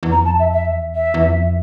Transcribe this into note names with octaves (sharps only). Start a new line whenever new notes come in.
E2
F2 A#5
A5
E5
E5
E2
E5
E2
F2